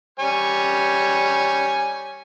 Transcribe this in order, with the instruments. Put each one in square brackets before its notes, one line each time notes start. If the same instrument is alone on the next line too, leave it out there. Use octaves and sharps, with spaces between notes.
[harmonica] G3 C#5 G#5